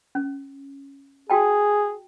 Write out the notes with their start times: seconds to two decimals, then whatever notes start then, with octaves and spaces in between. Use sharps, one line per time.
0.15 C#4
1.30 F#4 G#4 G5 A5